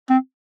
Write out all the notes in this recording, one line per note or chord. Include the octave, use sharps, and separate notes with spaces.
C4